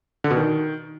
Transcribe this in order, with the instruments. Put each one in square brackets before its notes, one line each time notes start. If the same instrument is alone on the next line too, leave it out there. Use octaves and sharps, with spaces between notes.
[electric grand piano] D3
B2
D#3